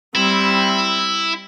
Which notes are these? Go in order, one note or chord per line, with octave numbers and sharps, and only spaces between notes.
G3 C4 E4